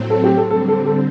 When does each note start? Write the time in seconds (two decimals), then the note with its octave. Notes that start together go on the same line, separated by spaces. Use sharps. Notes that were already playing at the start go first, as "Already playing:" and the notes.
Already playing: A2 F#3 C4
0.10 A4
0.24 G4
0.37 A4
0.50 D3 G3 C4 A4
0.69 A4
0.86 A4